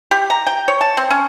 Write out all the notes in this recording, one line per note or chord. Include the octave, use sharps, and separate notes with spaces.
G4
A#5
G5
C#5
A5
C4
C#4